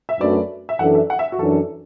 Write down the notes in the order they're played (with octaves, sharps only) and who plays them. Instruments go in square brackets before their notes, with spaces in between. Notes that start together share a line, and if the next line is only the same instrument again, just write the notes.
[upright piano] E5
[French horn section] F#2 F#3 A3 D4 B4 [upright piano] D5
[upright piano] E5
[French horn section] F#2 E3 D4 A4 D5 [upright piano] F#5
[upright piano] E5
F#5
E5
F#4
[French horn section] F#2 E3 D4 [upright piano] A4